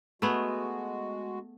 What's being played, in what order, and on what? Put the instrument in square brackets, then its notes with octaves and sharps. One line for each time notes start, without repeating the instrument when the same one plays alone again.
[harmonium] G#3 F#4 [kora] A3 B3 G#4